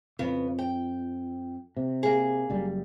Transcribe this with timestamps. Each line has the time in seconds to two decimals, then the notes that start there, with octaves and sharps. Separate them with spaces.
0.19 F2 C#3 B3
0.59 G5
1.77 C3
2.03 A#3 G#4
2.50 F#1 F#2 G3